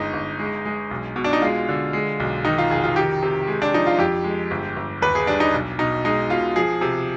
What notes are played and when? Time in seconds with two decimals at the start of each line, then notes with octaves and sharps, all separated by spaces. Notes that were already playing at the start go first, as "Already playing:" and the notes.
Already playing: G1 G#3 D#4
0.13 G1
0.39 G#3
0.65 G#3
0.91 B1
1.16 B2
1.24 D4
1.33 D#4
1.42 G#3 F4
1.68 D3
1.93 G#3
2.20 B1
2.45 D#3 D#4
2.58 F4
2.70 F1 G#4
2.84 F4
2.96 D#3 G4
3.23 C3
3.47 G#3
3.62 D4
3.73 F3 D#4
3.87 F4
3.99 F2 G4
4.24 G#3
4.51 G1
4.76 G1
5.02 D#2 B4
5.15 G#4
5.27 G3 D4
5.40 D#4
5.53 B1
5.79 B2 D#4
6.05 G#3 D#4
6.30 B2 F4
6.56 F3 G#4
6.81 C3